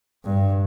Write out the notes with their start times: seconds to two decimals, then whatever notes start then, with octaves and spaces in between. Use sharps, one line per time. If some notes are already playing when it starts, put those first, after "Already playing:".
0.24 G2